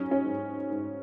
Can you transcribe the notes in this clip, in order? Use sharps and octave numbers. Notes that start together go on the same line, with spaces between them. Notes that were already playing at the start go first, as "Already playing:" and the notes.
Already playing: F#3 C#4 D#4
C#4
G#2
G#2